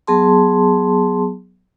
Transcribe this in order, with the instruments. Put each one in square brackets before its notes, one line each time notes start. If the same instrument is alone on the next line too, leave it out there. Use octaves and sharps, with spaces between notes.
[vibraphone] F#3 B3 G#4 A5 C6